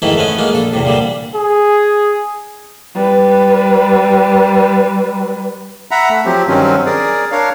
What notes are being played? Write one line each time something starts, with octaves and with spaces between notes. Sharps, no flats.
F2 G#2 D#3 E3 A3 E4
A3 B3 C#4 D#5
G#3 A#3 F4
A#1 A4
E2 A2 C3
A#2 D3 G3
G#4
G3 B4
E5 F#5 A#5 B5
A3
F3 F#3 C4 G4
G2 D#3 F#3 C4 C#4
G#4 A#4 D5
D4 A#4 C#5 F5